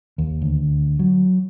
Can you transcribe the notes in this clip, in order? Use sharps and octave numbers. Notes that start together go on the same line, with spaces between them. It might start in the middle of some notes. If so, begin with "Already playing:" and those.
D#2
D2
F#3